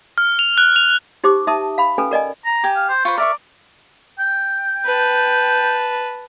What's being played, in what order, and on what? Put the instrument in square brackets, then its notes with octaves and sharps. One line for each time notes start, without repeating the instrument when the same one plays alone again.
[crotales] F6
F7
F#6
F7
[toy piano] D#4 G4 C5 D6
D#4 E5 A5 D#6
F5 B5
C#4 A4 B4 G#5
A#4 D5 D#5 G#5
[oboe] A#5
[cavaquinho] G4 G#5
[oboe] F5
C5
[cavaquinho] F4 B4 C5 [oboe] C#6
[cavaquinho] A#4 E5 C#6 [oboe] D5
[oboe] G5
[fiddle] B4 A5